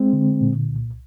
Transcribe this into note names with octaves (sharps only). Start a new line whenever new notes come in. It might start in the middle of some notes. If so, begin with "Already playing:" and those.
Already playing: G#3 C4
D3
A#2
C2